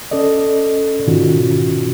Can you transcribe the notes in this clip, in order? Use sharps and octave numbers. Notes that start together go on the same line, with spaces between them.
C#4 A4 D5 D#5
G#2 B2 D#3 C#4 F4 F#4